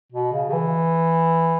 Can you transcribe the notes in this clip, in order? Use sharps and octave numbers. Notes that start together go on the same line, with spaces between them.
B2
C#3
C#3
E3